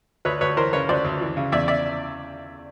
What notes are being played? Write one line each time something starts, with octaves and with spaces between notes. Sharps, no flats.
D2 B4 C#5
D2 B4 C#5
E3 A#4 C5
C#3 B4 C#5
D2 C5 D5
D2
E3
C#3
E2 D5 E5
D5 E5